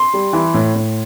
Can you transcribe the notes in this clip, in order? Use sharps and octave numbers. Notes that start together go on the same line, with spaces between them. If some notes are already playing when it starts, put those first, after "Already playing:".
Already playing: C6
G3
E3
A2
A2